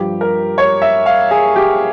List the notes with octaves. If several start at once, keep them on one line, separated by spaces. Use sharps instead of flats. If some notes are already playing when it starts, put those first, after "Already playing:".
Already playing: G2 F3 G4
A#4
C#5
E5
F5
G#4
G4